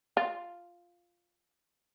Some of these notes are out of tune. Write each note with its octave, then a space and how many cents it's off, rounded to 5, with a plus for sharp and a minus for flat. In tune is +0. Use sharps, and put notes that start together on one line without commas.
F4 +0